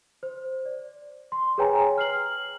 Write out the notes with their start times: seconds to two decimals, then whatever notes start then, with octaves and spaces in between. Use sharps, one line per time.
0.23 C5
0.65 D5
1.32 C6
1.58 G#4 B4 C#5 G5 G#5 A#5
1.98 F6 C7 F#7